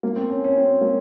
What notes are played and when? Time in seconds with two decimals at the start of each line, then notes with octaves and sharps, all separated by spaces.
0.03 A#3
0.16 C4
0.30 C#4
0.44 C#4
0.57 C4
0.81 A#3
0.85 C4